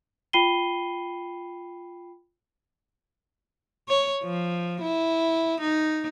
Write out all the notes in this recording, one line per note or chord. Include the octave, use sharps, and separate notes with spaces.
F4 G5 B5 C7 D#7 G7
C#5
F3
E4
D#4